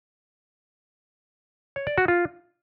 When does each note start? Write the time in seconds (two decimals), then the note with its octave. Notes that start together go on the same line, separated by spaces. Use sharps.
1.76 C#5
1.87 D5
1.98 F#4
2.08 F4